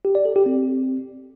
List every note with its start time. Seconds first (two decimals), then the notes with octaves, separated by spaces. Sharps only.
0.05 G4
0.15 D5
0.25 A4
0.36 G4
0.46 C4